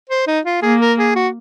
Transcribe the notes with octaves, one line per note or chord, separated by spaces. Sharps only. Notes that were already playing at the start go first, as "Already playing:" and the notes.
C5
D#4
F4
A#3 G#4
A#4
G#4
F#4